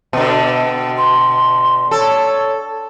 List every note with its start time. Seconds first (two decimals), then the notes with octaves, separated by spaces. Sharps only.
0.13 B2 D3
0.97 C6
1.91 A4 C#5